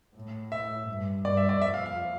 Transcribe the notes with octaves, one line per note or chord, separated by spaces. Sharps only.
A2
E5
G2
G2 D5
E5
D5
F2 E5
F5
F5